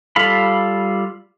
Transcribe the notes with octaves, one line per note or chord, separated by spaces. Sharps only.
G3 F4 A4 F5 B5